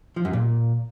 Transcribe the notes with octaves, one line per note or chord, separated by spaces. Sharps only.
F3
F#2
A#2